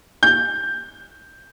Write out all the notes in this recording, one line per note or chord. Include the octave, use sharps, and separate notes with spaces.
G6